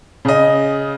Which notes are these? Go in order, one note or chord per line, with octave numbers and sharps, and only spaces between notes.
C#3 D#5